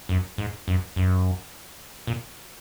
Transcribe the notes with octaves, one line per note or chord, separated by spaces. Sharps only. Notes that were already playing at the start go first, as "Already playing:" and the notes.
F#2
G#2
F#2
F#2
A#2